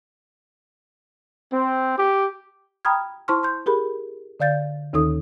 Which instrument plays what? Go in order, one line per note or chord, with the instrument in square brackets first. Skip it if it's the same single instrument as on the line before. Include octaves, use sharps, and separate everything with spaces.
[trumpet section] C4
G4
[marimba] G5 A#5 B5 D#6 F6 G#6
E4 C5 A5 C6 C#6 F6
C6 G6
G4 G#4 A#4 B5
D3 D5 F5 G6 A6
D#2 D#3 D#4 A4 D#6